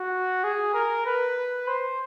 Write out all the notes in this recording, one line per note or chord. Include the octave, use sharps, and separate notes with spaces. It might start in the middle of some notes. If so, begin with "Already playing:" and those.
Already playing: F#4
G#4
A#4
B4
C5